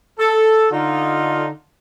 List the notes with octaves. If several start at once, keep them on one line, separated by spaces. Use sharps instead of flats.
A4
D3 D#4 F4